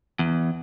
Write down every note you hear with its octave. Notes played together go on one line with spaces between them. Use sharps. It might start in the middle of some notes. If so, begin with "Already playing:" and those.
E2